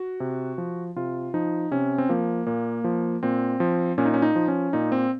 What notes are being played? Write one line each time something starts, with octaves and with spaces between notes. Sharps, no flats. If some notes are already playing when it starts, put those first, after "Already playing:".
Already playing: F#4
C3
F3
C3 F4
F3 D#4
C3 C#4
C4
F3 A#3
A#2 A#3
F3
A#2 C4
F3
A#2 C#4
D#4
C#4
D#4
F3
C#4
A#2 D#4
C4